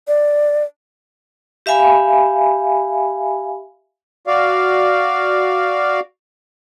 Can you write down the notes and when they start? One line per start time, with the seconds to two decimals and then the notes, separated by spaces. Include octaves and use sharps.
0.08 D5
1.66 G4 E5 F5 G#5 B5
4.27 F#4 D5 F5